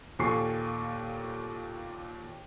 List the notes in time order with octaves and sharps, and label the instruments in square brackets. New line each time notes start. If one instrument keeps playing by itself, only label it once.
[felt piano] D#2 A#2 A4 G#5 C#6 C7